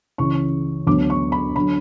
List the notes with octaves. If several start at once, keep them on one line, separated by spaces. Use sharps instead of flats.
C#2 C#3 E3 C#6
D2 D3 F#3 B3 D6
C#6
B5
D3 F#3 B5